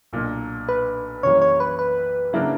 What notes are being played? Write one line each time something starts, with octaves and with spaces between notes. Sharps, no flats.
B1 A#2 A#3 D4 A#4
B4
F#2 E3 G3 A#3 C#5
C#5
B4
B4
C#3 F#3 A#3 D4 E4 F#4